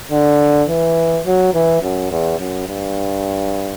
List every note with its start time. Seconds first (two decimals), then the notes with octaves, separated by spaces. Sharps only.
0.11 D3
0.68 E3
1.26 F#3
1.54 E3
1.82 F#2
2.11 E2
2.40 F#2
2.68 G2